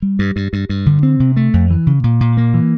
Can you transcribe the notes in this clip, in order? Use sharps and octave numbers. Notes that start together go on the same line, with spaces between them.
G3
G2
G2
G2
G2
D3
C4
C3
A3
F2
E3
C#3
A#2
A#2
A#3
E3